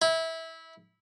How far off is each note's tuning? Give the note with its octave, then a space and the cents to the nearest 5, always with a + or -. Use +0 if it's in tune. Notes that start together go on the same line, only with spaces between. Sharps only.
E4 -20